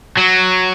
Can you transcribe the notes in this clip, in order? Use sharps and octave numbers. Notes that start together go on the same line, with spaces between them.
F#3